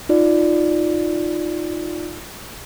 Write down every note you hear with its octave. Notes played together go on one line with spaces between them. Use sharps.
D#4 F4 D5